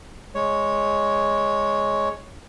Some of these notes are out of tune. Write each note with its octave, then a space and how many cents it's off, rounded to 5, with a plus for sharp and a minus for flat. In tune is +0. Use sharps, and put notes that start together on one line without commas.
G#3 +0 C#5 +0